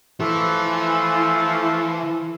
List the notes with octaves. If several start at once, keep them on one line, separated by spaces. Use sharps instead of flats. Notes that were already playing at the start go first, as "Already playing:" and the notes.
E3 F3 A3 A4